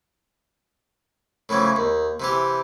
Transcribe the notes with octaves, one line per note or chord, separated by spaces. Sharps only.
A2 C#3 E3 F3
D#2
C3 E3 G4